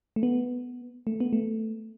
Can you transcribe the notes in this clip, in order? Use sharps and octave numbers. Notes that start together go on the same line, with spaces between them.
A3
B3
A3
B3
A3